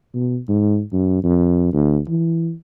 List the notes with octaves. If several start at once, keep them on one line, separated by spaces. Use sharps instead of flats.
B2
G#2
F#2
F2
D2
E3